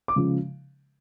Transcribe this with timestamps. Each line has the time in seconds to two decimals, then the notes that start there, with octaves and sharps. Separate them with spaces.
0.08 D6
0.16 C#3 F3 G#3